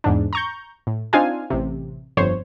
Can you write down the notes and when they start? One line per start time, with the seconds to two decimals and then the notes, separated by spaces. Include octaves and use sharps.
0.04 E2 G#2 D4
0.33 A#5 C#6 G6
0.87 A2
1.13 C4 D4 D#4 F4 F5 G#5
1.50 A1 C3
2.17 G1 F2 C5 C#5